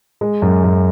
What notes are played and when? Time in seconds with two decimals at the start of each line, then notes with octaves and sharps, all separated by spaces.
0.21 G#3
0.42 F#2
0.64 F#2